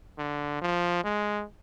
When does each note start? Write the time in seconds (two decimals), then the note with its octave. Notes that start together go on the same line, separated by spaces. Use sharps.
0.18 D3
0.62 F3
1.05 G#3